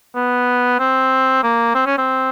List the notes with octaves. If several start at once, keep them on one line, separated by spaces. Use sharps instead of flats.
B3
C4
A#3
C4
C#4
C4